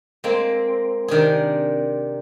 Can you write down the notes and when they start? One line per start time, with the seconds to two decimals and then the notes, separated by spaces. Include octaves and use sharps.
0.24 G#3 A#3 C4
1.08 C3 D#3 D4 G#4